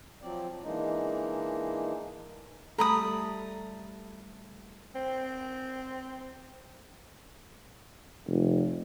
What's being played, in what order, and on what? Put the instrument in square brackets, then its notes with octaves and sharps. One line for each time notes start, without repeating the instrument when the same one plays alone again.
[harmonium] F3 F#3 C4 D5
E3 G#3 A#3 D4 D#4
[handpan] G3 A3 A4 [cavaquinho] A#5 B5 D#6
[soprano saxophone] C4
[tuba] F1